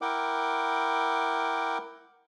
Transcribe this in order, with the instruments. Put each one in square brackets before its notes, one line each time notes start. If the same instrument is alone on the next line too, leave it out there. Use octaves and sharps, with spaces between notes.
[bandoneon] E4 A#4 F#5 G5 D6